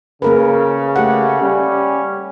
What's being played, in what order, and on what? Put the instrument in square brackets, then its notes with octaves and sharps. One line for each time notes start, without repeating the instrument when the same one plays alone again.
[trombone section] C#3 [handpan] A#3 A#4 B4
[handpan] A3 G4 F#5
[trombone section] G3 C#4